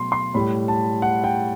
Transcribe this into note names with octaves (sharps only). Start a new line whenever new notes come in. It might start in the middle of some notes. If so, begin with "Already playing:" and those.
Already playing: B2 F#3 A3 C6
C6
A2 G3 B5
A5
F#5
G5